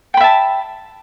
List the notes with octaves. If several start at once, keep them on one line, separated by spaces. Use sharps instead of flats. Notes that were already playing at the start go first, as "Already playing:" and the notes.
E5 G5 A5 B5